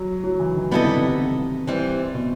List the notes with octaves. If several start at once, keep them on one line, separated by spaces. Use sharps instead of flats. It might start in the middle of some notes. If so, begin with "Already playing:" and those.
Already playing: F#3
F#3
E3
D#3
C3 G3 B3 E4 A4 D#5
D#3
C3
C3
E3 G3 C4
B2